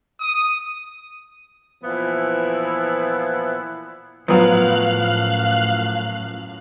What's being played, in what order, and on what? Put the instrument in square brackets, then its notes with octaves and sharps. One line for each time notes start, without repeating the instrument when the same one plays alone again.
[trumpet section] D#6
[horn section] A#2 E3 F3 B3 E4
[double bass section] F#2 A2 [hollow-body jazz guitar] F3 [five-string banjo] F#3 B3 [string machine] F5 F#6